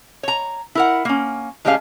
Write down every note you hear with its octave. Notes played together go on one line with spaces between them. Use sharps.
C#5 A#5
E4 A#4 F#5
A#3 C#4
A2 G3 G#3 C#4 D#4 F5